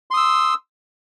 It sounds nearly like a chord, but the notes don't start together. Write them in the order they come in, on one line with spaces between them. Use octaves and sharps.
C6 D#6 E6